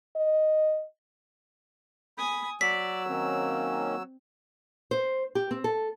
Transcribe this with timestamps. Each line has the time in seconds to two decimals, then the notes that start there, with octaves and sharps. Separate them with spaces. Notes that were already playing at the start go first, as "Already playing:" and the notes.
0.16 D#5
2.18 G#5 B5 D#6
2.61 F#3 D5 E6 B6
3.08 D#3 A#3 C4 C#4
4.91 C5
5.35 G4
5.51 C4
5.64 A4